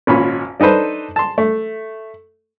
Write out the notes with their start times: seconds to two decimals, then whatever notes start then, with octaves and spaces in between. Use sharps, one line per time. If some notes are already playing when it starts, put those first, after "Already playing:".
0.07 G#1 A#2 C#4 B5
0.60 D4 D#4 A4 B4 C5
1.16 A5 C6
1.38 A3